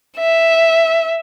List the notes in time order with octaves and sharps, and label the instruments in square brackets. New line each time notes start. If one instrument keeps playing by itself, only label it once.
[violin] E5